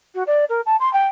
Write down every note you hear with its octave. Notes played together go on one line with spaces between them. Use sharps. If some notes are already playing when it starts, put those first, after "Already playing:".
F#4
D5
A#4
A5
C6
G5